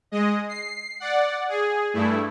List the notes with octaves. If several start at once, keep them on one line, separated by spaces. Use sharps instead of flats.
G#3 D#5
C7
D5 F#5
G#4
G2 A3 E4